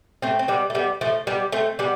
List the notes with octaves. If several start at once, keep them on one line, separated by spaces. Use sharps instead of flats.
A3 C4
C4
G3 B3
A3
G3 B3
F3 A3
G3 B3
A3 C4
G3 B3